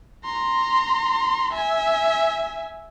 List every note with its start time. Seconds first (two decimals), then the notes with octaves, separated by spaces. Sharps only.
0.24 A#5 C6
1.53 E5 G#5